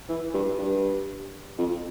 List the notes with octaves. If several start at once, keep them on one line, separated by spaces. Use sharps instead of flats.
E3
G2
G2
F2